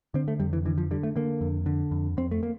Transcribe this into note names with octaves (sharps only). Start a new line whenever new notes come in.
D3 C4
A3
F2 G3
E3
D3 E3
F3
D3 G3
A3
D3 A#3
F2
D3
F2
F2 C4
A3
A#3